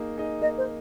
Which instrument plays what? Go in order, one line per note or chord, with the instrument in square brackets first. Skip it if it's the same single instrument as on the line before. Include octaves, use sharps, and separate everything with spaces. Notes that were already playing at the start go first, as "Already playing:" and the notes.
Already playing: [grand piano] A#3 D#4 G#4 D#5
D#4 G#4 D#5
[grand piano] A#3 [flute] D#5
[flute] C5